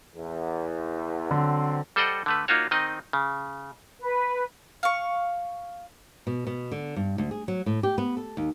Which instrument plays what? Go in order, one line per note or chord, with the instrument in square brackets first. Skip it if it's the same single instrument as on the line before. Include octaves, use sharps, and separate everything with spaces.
[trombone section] E2
[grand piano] D3 [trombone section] F#3 C4
[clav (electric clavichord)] G3 A4 C5 D#5 F#5 G5
D3 A3 B4
A#3 D#4 F4 F#4 C#5
D#3 C4 D#4 D#5
C#3
[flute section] B4
[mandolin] F5 C#6
[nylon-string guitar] B2
B2
D3
G2
D2
G#4
F#3
A2
G4
B3
A4
D#2